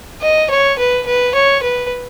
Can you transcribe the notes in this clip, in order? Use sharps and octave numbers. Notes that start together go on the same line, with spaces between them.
D#5
C#5
B4
B4
C#5
B4